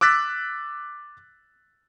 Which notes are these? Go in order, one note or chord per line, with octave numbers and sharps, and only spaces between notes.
D6 E6 F#6 A6 B6